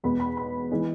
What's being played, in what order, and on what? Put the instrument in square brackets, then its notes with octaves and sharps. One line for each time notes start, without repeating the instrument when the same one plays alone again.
[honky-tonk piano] E2 B2 G#3 B3 B5
B5
B5
E3 G#3 B3